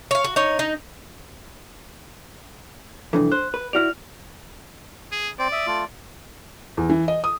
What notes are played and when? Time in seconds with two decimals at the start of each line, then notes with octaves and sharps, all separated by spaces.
0.11 C#5 F5
0.24 F#4
0.36 D#4 C#5
0.59 D#4
3.13 C2 F2 E3 D4 A4
3.32 C5 F#6
3.54 B4
3.73 E4 F#4 D5 F6 F7
5.12 G#4
5.39 C4 C5 D5
5.52 E5 D#6
5.67 A3 F4
6.77 E2
6.90 E3
7.08 D#5
7.24 D#6